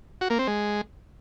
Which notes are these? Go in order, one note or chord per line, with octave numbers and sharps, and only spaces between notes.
F#4
A#3
C4
G#3